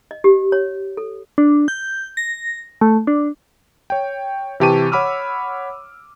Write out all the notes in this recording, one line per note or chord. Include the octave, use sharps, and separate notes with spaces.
D#5
G4
C#5
A4
D4
G6
A#6
A3
D4
C#5 G5
C3 E3 G4 A5 C#6 D#7
C#5 F#5 B5 D6 E6 F6